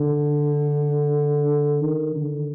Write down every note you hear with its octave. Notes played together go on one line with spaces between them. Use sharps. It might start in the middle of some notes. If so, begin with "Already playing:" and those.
Already playing: D3
D#3
D3